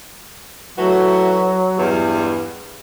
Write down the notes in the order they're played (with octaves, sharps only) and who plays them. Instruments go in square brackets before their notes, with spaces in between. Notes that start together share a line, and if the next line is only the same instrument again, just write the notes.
[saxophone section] E3 A3 F#4 [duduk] F#3
[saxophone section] E2 G2